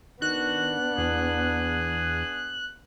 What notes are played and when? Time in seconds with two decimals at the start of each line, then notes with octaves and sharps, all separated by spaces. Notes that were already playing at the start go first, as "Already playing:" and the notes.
0.22 D#3 B3 D4 F#4 F#6
0.98 E2 G#4